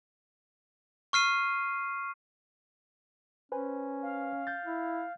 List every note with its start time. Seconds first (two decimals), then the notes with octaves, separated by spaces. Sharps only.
1.13 C#6 F6 C7 D#7
3.52 C#4 B4 C5 G#5
4.02 F5
4.47 G6 A6
4.65 E4